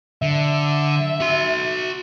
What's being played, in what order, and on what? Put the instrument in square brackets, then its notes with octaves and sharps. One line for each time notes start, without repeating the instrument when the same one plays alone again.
[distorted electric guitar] D3 [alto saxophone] E5
[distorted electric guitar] F#4 C6